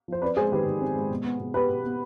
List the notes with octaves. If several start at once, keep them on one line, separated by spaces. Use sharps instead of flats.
F3 C5
C4 B4 D5
G#3 G#4 C5
D#3 G4 B4
D#3
C4
G#3
B2
B3
B2
B3 G4 B4
B2
B3